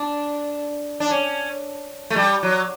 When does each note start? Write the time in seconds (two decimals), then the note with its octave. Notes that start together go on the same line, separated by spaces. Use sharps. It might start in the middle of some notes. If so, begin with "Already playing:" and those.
Already playing: D4
1.00 D4
1.11 C#4
2.10 A3
2.16 G3
2.43 F#3